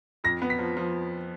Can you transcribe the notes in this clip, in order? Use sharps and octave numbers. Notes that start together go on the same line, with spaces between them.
F2 A#6
B3
B6
F3
F3